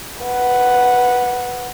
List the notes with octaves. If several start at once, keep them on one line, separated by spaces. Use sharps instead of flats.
B4 F#5